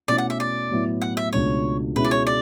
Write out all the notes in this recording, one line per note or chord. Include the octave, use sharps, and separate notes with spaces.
B2 A3 C#4 E4 D5
F#5
E5
D5
A2 F#3 B3 E4
F#5
E5
C#2 B2 A3 D4 C#5
B2 G#3 C#4 E4 B4
D5
C#5
D5